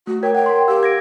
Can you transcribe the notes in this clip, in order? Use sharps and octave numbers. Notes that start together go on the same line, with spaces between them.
A3 F#4
A#4 C#5 G5 G#6
F#5 G5
A#4 C6
G4 F5 E6
G#6 A#6 D7